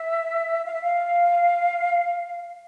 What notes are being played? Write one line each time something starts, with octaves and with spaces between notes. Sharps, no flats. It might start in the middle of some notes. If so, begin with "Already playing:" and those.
Already playing: E5
F5
E5
F5